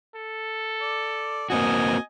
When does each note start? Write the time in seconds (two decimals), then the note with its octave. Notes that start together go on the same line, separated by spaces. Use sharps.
0.16 A4
0.81 D5
1.50 A#3 C4 F#4 D#5 G#5